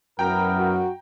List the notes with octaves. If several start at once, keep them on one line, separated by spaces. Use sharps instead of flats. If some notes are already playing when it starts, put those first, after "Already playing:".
F#2 B3 E4 A#4 G5 A#5
F#4